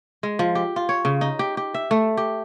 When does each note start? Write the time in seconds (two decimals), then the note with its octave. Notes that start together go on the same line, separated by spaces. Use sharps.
0.23 G#3
0.39 F3
0.55 G4
0.76 F4
0.89 C#5
1.05 C#3
1.21 D#4
1.39 G4
1.57 G4
1.74 E5
1.91 A3
2.17 G4